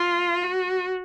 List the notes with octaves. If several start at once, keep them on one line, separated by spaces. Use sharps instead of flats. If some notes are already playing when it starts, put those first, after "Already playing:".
Already playing: F4
F#4